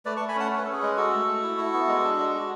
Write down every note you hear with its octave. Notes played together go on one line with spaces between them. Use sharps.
A3 B4 D5
A5 C#6
A3
G#5 B5
C#4 F#5 A5
C#4 C#5
B4
C#4 A4
G#4 B4
G#3
F#4 A4
A3
A3
E4
E4
B3
G#3
D4
G#3
F#4